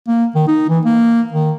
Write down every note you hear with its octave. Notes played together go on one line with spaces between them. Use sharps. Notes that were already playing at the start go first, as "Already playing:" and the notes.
A#3
D#3
D#4
E3
A#3
D#3